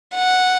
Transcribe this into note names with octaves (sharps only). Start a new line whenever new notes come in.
F#5